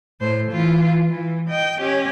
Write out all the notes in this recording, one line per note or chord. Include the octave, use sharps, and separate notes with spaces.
A2 C5
E3 F4
E3
D#5 G5
C#4 G4